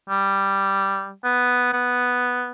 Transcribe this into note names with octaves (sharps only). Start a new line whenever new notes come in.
G3
B3
B3